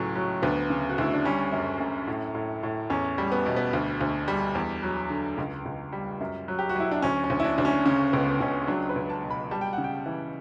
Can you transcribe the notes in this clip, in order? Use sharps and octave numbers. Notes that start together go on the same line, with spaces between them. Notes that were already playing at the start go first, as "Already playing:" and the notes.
Already playing: C#2 A2 F#3 C#4
F#3
D2 B3
C#3
F#4
D2 E4
D4
G3 C#4
F#2
F#2
A2
A2
A2
E2 C#4
G3
B3
B2
B3
D2
D2
G3
E2
F#3
D3
C#2
C#2
G3
F#2
F#3
G4
F#4
F#3 E4
D4
D2 C#4
C#4
D2
E4
D4
D2 D4
C#4
C#3 C#4
C#2 B3
C#2 C#4
F#3 D4
B4
C#2
A5
B2
B5
G3 A5
G5
F#5
C#3
G5
E3